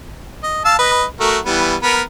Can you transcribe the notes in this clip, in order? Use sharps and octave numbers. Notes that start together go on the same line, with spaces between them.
D#5
F5 A5 E6
B4 D#5
A3 F#4 A#4
E3 G3 B3
B3 A#4 B5